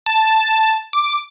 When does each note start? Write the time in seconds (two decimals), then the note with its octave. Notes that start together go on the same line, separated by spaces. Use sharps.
0.06 A5
0.93 D6